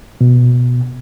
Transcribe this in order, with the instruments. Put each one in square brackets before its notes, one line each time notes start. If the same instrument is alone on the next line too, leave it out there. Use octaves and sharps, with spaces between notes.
[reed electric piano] B2